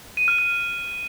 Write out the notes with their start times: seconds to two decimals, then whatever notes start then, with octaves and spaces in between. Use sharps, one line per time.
0.17 D#7
0.28 F6
0.38 F6